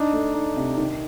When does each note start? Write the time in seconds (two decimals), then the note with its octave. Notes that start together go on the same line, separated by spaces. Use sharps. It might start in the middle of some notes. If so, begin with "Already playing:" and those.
Already playing: D4 D#4
0.13 A3
0.34 D#4
0.56 C3
0.78 D#3